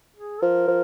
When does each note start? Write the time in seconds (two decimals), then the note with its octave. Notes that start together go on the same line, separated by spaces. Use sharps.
0.16 G#4
0.41 F3 A#4
0.68 F3